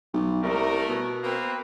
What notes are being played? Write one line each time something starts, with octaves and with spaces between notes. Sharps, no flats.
B1
C2 A3 A#4
B2
A#3 C4 B4